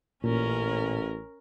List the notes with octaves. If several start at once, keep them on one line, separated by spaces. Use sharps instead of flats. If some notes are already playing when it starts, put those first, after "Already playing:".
A1 A#2 C#4 A#4